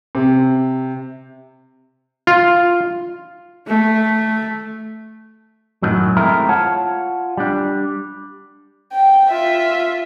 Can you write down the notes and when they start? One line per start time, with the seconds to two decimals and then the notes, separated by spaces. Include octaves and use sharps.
0.15 C3
2.27 F4
3.68 A3
5.83 F#2 A2 D#3 F#3
6.17 G#3 A3 C4 E4 A#4
6.49 F4 C#5 F#5 A5
7.37 G3 D4
8.92 G5
9.30 F4 E5